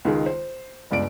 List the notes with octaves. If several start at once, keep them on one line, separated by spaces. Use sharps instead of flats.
C#2 D#3 G#3
C5
G1 C#2 D5 D7